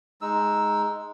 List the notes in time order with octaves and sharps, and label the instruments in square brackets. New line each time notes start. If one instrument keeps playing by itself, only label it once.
[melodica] G#3 D#4 E6